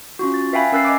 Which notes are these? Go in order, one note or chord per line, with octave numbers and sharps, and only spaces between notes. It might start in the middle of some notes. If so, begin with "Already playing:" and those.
C#4 F4 F#4
A6
B4 E5 F5 G5 G#5 B5
C#4 A#4 E6 F#6 A6 C7
D#5 G#5 D6